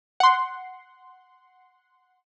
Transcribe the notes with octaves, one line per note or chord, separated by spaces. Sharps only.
F#5 C6